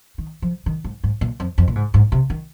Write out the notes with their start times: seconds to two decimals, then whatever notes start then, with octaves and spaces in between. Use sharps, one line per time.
0.18 D#3
0.42 F3
0.66 D#3
0.84 G#2
1.04 G#2
1.21 A#2
1.40 F2
1.58 F2
1.68 A#2
1.76 G#2
1.94 G#2
2.12 C3
2.30 D#3